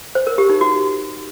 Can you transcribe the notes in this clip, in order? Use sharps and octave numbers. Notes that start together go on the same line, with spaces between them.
C5
A#4
G4
D#4
F#4